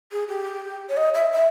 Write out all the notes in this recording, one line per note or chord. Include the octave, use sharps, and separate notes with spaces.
G#4
G4
C#5
D#5
E5
E5